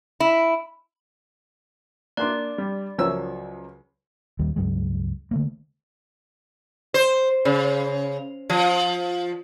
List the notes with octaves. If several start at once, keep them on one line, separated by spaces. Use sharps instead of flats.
E4
A#3 D4 D5 C6 F#6
G3
C#2 F3 F#3 A#4 C#5 E6
D#2 D#3 G3
C#2 G2 F#3 G#3
D3 A3 A#3
C5
C#3
F3